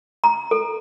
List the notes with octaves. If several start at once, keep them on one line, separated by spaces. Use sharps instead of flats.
A#5
A4